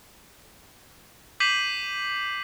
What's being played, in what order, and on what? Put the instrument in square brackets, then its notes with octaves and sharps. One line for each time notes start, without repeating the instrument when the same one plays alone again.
[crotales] D6 G6 B6 C7 D#7 F#7